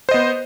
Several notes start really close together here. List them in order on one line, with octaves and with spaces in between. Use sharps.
C5 D#5 B3